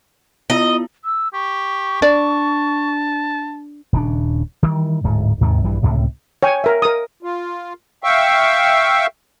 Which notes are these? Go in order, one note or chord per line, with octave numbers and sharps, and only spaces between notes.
B3 E4 F4 D#5
E6
G4 C#6
D4 D5 A5
D#1 C#3 D4
D#3 E3 G3
D1 G#2
D#2 G#2 C3 D#3
A#1 G2 E3 G3
C#2 A2 C3
C#5 G5 G#5
A#4 E5
A#4 D#6
F4
E5 F5 G5 C#6 E6